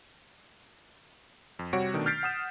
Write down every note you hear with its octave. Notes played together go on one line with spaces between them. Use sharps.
F2
C3 G3 F#4 C#5 D7
B2 D#3 A3 D4
F6 G6 A6 B6 C7 D7
F#5 D#6 E7